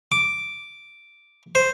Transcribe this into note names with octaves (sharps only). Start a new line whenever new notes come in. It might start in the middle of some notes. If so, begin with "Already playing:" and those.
D6
C5